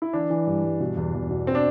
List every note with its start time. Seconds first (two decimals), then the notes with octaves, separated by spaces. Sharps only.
0.02 E4
0.13 E3 D4
0.30 E3
0.47 G2
0.64 G2
0.80 B2
0.97 E2
1.14 E2
1.31 B2
1.47 C4
1.55 D4